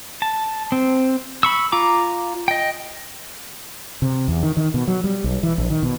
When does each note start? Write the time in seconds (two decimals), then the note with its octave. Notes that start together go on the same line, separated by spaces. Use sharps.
0.22 A5
0.72 C4
1.43 B5 C#6 E6
1.72 F4 A#5 D6
2.48 D#5 G5
4.02 C3
4.28 E2
4.43 D#3
4.57 D#3
4.74 B2
4.88 F#3
5.04 G3
5.24 B1
5.43 E3
5.58 A#1
5.70 D#3
5.83 B2